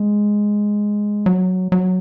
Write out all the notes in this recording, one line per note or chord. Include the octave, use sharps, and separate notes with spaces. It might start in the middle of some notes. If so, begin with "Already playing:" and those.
Already playing: G#3
F#3
F#3